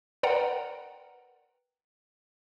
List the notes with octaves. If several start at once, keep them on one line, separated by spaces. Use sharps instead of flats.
A#4 B4 D5 F#5 G5 A#5